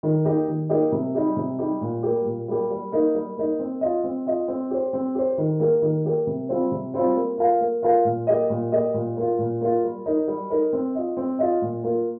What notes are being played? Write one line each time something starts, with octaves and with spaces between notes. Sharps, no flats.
D#3
A#3 D#4 G4 D#5
D#3
A#3 D#4 G4 D#5
C3
G3 D#4 G4
C3
G3 D#4 G4
A#2
G3 A#3 G4
A#2
G3 A#3 G4
G3
A#3 D#4
G3
A#3 D#4
C4
F4 D#5
C4
F4 D#5
C4
G4 C5
C4
G4 C5
D#3
A#3 G4 A#4
D#3
A#3 G4 A#4
C3
G3 C4 F4 C5
C3
G3 C4 F4 C5
A#3
F4 A#4 F5
A#3
F4 A#4 F5
A#2
A#3 G4 D#5
A#2
A#3 G4 D#5
A#2
A#3 F4
A#2
A#3 F4
G3
D#4 A#4
G3
D#4 A#4
C4
F4 D#5
C4
F4 D#5
A#2
A#3 F4